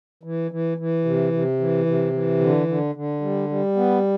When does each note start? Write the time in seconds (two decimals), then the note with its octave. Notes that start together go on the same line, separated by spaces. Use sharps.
0.23 E3
0.51 E3
0.77 E3
1.05 C3
1.33 C3
1.60 E3
1.86 C3
2.13 E3
2.40 D3
2.68 D3
2.95 D3
3.21 G3
3.49 G3
3.76 B3